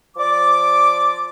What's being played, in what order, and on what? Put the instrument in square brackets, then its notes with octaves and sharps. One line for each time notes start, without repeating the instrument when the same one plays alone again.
[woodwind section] F3 D5 D6